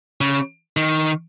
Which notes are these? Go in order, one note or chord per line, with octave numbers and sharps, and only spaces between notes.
C#3
D#3